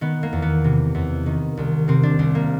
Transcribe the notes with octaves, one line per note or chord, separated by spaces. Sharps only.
D#3 B3
A#3
E2
B3
C3
E2
D#3
C2
C3 C4
D4
C2 C4
A#3